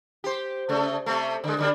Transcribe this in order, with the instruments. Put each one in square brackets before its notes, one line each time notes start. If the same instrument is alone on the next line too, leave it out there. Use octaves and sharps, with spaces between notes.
[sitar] G4 C5
C#3 A3
C3 A3
D3 G#3
D3 G3 D4